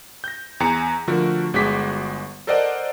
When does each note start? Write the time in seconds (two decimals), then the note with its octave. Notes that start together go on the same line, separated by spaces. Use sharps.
0.24 G6 A#6
0.60 E2 G#5 A#5 A#6 C#7
1.07 D3 F3 A3 F#4 A#4
1.54 G1 G#3 F#4 D6 B6
2.47 A4 A#4 C5 D5 D#5 F#5